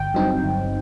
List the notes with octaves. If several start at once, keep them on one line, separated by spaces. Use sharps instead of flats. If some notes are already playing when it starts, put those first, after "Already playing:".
Already playing: G1 G5
G2 F#3 C4 D#4
G1